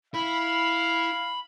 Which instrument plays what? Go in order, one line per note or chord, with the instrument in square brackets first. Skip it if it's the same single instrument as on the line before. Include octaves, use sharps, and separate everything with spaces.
[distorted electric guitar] E4 [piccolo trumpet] F5 [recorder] B5